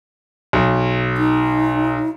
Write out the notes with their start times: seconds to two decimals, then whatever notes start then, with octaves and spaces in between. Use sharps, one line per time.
0.53 B1
1.18 D#4